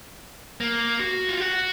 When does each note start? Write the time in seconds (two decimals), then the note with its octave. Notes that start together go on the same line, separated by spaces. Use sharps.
0.61 A#3
1.00 F#4
1.29 F4
1.40 F#4